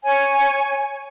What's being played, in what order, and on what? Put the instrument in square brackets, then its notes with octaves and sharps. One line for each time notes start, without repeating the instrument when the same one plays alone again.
[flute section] C#5 G#5